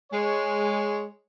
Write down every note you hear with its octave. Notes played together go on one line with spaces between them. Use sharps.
G#3 C#5